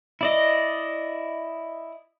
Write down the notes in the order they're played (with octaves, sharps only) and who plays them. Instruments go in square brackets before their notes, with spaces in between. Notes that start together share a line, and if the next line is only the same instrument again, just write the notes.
[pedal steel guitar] E4 D5 D#5